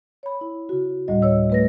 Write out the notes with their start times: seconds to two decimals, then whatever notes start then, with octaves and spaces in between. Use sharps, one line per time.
0.23 C#5 B5
0.41 E4
0.69 C#3 F#4
1.08 D2 A2 G3 D#5
1.22 C#5 E6
1.50 A3 B4 A#6